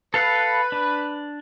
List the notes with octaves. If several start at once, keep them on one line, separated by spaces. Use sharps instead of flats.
A4 B4 F5 F#5
D4